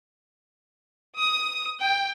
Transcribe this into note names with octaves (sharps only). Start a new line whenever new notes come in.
D#6
G5